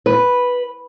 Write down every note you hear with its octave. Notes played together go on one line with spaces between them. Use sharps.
B4